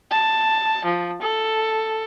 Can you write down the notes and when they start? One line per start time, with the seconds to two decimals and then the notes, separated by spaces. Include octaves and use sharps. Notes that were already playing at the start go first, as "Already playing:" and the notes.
0.11 A5
0.85 F3
1.22 A4